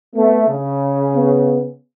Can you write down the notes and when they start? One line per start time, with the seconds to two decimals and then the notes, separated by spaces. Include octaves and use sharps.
0.16 A3 B3
0.49 C#3
1.16 B3